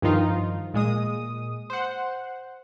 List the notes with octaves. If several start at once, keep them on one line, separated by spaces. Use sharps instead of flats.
G2 D#3 F3 D#4 F4
A#2 G#3 D#6
C5 F#5